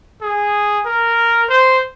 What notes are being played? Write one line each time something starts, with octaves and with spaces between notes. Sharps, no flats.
G#4
A#4
C5